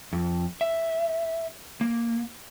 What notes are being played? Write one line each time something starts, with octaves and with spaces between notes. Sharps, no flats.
F2
E5
A#3